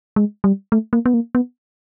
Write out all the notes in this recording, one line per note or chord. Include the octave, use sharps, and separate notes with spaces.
G#3
G3
A3
A#3
B3
A#3
B3